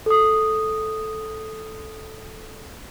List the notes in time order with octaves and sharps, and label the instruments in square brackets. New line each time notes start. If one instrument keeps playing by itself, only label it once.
[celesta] A4 D#6